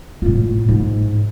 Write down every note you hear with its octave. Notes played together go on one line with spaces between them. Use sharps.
A2 F4
G#2